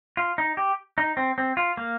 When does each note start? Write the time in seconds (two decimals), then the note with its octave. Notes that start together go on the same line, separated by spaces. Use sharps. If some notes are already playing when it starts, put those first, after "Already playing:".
0.17 F4
0.38 D#4
0.57 G4
0.98 D#4
1.17 C4
1.38 C4
1.57 F4
1.77 A#3